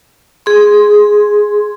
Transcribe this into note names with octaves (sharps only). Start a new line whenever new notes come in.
G#4 C6